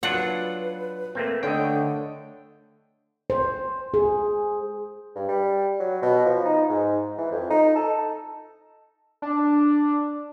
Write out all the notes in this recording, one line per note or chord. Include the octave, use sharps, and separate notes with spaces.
F#3 D4 F4 B4 F#5
A3 A#3 C4
D3 A3 C#5 D#5 G5
C5
G#4
G2
G3
F#3
B2
F3
D#4
G#2
E3
F2
D#4
A4
D4